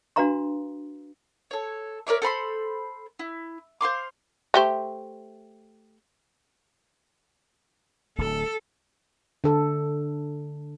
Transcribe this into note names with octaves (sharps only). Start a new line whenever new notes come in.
D4 F#4 B4 F5 A#5 C6
A4 C#5
A#4 C#5 D5 E5
A4 C5 B5 C6
E4
C5 F5 C6 D6
A3 G4 C5
D1 D2 A4
D3 A4